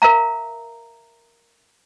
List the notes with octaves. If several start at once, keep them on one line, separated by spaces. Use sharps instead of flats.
A#4 E5 F5 A#5